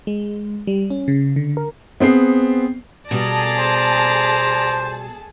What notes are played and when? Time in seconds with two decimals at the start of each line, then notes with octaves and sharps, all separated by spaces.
0.07 G#3
0.67 G3
0.90 C#4
1.08 C#3
1.36 D3
1.57 A#4
2.00 B3 C4 G#4 C7
3.11 B2 G3 G#4 A4 D5 A5 A#5
3.59 C5